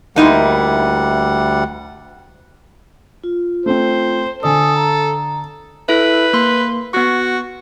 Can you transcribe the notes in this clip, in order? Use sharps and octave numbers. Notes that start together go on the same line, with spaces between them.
D2 G3 A#3 D#4 E4 F#5
F4
A3 C4 C5
D3 A4 D5 G#5 D#6
A#5
E4 A4 B4 E5
A#3 C6
B3 F#4 C#6